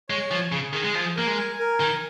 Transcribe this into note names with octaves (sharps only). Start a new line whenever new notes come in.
G#3 C#5
F3 G#5
C#3 G#4
D#3 G#4
G#3
F3 G#5
A#3 A#4
G#3
G#5
A#4
D#3 G#5